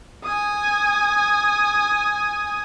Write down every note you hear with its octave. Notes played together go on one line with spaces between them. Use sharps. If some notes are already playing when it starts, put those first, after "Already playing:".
G#5 D#6